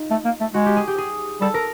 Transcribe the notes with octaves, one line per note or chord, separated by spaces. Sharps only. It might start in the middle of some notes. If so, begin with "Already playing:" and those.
Already playing: D#4 F4
A3
A#3
A3
G#3 F#4
G4
G#4
G4
G#4
G3 A4
A#4